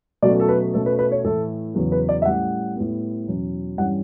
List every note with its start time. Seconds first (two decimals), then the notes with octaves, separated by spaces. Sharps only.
0.23 B2 F#3 A3 C#4 D5
0.40 A4
0.48 B4
0.74 B2 A3 C#4 A4
0.86 B4
0.99 B4
1.12 C#5
1.24 A2 E3 A3 A4
1.75 E2 C#3 F#3 B3
1.92 B4
2.09 D5
2.22 E5
2.25 A2 G3 C#4 F#5
2.76 A2 G3 B3
3.27 E2 B2 F#3 C#4
3.78 G2 E3 G3 C#4 F#5